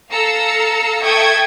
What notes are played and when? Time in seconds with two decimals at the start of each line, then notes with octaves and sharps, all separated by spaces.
0.10 A4 F5 A#5 E6 C#7
1.01 A4 E5 G5 C#6 D#6 G#6